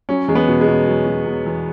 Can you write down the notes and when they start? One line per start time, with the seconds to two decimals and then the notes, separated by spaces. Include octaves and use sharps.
0.09 F#3 C#4
0.28 E2 G#3
0.35 B3
0.48 B2
0.61 G#3
0.67 B2
0.87 F#3
1.06 B2
1.26 B2
1.46 E2